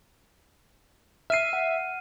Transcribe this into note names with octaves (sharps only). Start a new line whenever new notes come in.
E5 F6 C7 D#7
F#5